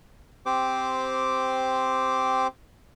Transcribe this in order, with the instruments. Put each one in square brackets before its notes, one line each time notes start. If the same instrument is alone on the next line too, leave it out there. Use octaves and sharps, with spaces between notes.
[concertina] C4 G4 C5 D6